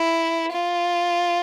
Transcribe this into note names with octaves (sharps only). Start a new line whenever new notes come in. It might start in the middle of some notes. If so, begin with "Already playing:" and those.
Already playing: E4
F4